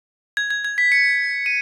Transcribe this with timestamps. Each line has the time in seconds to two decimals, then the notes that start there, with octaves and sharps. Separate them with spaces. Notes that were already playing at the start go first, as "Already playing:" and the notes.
0.37 G#6
0.50 G#6
0.65 G#6
0.78 B6
0.92 C#7
1.46 D#7